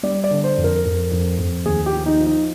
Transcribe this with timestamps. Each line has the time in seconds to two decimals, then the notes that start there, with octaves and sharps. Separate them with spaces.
0.03 G3 D5
0.24 D5
0.31 D3
0.44 C5
0.57 F2
0.64 A#4
0.85 F2
1.11 F2
1.39 F2
1.65 D#2 G#4
1.86 G4
1.93 F3
2.06 D#4
2.20 F3
2.26 D#4